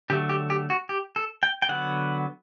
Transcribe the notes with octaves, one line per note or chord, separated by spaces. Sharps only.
D3 F#3 A3 G4
G4
G4
F#4
G4
A4
G5
G5
D3 F#3 B3 F#5